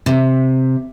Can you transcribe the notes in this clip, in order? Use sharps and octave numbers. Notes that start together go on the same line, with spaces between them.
C3